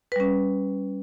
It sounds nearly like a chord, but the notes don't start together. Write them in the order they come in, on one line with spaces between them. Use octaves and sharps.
B4 G3 C#4